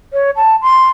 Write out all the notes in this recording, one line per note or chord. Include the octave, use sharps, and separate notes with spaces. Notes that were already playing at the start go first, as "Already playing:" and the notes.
C#5
A5
C6